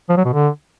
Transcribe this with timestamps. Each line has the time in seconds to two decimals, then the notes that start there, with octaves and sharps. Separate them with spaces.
0.09 F3
0.17 F#3
0.25 B2
0.32 D3